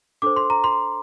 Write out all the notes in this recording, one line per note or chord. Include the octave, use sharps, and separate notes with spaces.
D4 A4 C5 D6
C6
A#5
C6